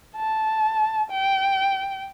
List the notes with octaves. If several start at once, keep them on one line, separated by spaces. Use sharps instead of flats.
A5
G5